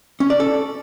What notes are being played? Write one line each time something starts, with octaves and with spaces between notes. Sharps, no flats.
C#4
D5
A4